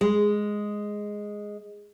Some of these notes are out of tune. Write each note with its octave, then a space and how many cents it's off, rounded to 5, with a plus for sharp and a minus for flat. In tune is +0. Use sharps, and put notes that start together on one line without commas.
G#3 +0